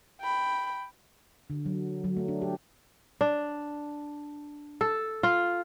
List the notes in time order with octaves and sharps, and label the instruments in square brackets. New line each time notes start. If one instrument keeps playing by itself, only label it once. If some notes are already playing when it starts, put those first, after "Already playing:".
[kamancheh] G5 B5
[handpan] D3
F#3
F#3
A3
D4
G4
[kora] D4
A4
F4